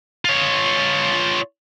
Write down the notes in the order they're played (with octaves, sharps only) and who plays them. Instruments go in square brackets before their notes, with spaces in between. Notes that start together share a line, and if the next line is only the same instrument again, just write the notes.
[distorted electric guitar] F4 C#5